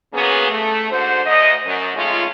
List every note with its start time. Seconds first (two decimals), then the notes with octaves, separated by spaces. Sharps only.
0.13 C#3 F#3 A#3 B3 C#4 G#4
0.50 A3
0.91 G#2 D3 F#4 C5
1.25 D2 D#5
1.66 F#2
1.95 D#3 G#3 A3 C#4 F4